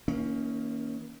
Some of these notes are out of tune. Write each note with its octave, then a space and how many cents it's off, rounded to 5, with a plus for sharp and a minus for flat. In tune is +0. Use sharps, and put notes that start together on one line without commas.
D#3 +40 A#3 +0 C#4 +5